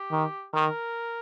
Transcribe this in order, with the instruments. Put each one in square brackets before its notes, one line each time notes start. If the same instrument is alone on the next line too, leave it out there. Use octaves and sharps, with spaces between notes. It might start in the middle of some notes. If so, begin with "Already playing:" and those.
Already playing: [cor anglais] G4
[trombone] D#3
[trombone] D#3 [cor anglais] A#4